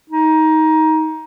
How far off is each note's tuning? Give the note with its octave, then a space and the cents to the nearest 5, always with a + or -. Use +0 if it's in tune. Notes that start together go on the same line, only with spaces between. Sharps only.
D#4 +20